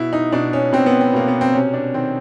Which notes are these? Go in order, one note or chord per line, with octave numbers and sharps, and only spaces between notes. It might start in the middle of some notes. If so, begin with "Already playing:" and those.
Already playing: B2 E4
D#4
B2 D4
C#4
B2 C4
B3
C4
B2 A#3
B3
C4
C3 C#4
D4
D#3 C4